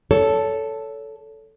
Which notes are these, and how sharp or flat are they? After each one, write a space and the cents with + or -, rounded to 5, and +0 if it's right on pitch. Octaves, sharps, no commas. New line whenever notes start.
A4 +0 C#5 +25